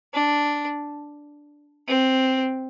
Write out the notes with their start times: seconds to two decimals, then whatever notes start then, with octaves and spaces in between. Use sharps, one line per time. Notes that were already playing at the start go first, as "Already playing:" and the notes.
0.14 D4
1.88 C4